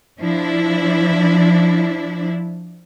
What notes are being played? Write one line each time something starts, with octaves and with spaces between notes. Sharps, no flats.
F3 D4 E4